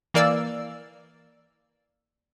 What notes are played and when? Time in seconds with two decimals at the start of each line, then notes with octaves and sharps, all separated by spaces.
0.14 E3 A#3 A#4 D5 E6